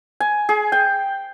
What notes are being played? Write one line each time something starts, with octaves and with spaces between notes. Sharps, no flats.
G#5
G#4
G5